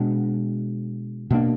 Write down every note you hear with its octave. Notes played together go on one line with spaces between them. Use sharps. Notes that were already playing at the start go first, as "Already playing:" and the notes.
Already playing: B2 G#3 D4
B2 A#3 D4